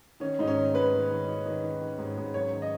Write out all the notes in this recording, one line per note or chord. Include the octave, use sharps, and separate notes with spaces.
D#3 C#4
G#2 D#4
C#4
D#3
G#2 B4
D#3
D#3
D#3
D#3
D#3
D#3
G#2
G#2
F#2 C#5
D#3
D#5